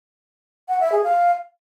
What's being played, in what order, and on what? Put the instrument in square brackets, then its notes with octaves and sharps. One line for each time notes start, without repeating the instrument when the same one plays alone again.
[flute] F#5
E5
G#4
F5